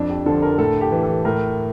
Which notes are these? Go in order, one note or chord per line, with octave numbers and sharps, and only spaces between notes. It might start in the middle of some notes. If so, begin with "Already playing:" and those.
Already playing: F2 D4
G4
D3 F3 A4
A#4
A2 A4
G4
E3
A4
A2 A#4